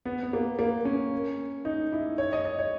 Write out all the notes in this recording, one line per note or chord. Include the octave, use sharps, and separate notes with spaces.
B3
B3
A#3
A#3
C#4
D#4
E4
C#5
D#5
D#5
C#5